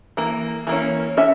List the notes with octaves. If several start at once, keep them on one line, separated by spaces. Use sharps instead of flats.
E3 A#3
E3 A#3 C#4
C#4 E5